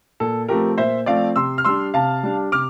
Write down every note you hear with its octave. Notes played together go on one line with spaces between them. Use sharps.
A#2 A4
F3 A3 C4 G4 A#4
A#2 C5 E5
F3 A3 C4 D5 F5
C3 C6 E6
F6
G3 D4 C6 E6
C3 F5 A5
G3 D4
C3 D6 F6